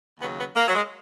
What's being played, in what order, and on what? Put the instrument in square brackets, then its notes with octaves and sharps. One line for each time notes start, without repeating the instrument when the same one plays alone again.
[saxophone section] D#2 C#3 F#3 B3
B3
A#3
F#3
G#3